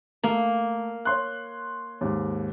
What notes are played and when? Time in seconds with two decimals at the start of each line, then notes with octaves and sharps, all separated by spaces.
0.24 A3 A#3
1.05 C#5 C6 F#6
2.01 D#2 G#2